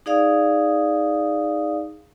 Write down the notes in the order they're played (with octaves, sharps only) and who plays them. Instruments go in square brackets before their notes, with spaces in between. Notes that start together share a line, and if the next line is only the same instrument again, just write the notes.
[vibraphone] D#4 G#4 D5 F5 D#6